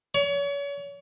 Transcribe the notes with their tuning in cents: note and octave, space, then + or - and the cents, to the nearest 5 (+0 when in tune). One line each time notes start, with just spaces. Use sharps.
C#5 +35